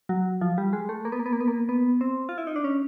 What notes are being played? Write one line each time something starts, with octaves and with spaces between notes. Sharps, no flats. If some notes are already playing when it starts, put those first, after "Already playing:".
F#3
F3
G3
G#3
A3
A#3
B3
A#3
B3
A#3
B3
A#3
B3
C4
F4
E4
D#4
D4
C#4